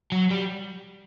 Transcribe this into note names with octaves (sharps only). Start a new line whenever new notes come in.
F#3
G3